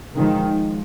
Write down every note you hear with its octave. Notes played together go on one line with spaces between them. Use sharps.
D#3 F3 G#3 F4